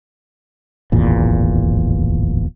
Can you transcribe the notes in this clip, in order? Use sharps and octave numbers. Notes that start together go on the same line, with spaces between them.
D1 G#1 E2 A#2